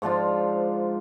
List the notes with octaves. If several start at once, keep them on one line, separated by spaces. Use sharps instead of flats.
G#2 F3 D4 F4